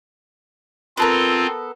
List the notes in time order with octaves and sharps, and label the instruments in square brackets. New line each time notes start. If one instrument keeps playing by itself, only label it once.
[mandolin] B3 A4 A#4 [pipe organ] C4 F4